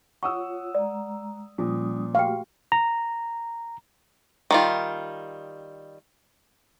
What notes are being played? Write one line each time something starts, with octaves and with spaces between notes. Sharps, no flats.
F4 C#5 F#5 C#6 D#6 E6
G#3 D5 A#5
A#2 F3 G3 C#4 D#6
A3 F#4 G4 F5 G5 C#6
A#5
D#3 G3 F4